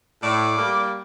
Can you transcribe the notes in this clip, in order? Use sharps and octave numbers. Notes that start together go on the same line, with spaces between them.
A2 D5
G3 A#3